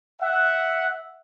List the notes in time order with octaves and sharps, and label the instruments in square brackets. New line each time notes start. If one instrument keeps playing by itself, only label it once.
[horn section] E5 F#5